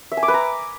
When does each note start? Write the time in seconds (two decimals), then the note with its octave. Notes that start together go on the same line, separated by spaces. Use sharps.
0.12 E5
0.17 G#5
0.23 D6
0.28 B4
0.34 A#5